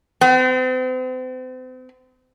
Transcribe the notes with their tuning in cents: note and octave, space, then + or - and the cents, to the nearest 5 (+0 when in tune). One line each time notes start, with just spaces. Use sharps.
C4 -40